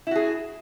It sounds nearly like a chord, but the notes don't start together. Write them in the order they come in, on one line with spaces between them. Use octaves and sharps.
E4 F#4 G#4